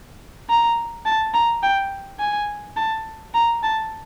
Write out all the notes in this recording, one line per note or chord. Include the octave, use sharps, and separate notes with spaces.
A#5
A5
A#5
G5
G#5
A5
A#5
A5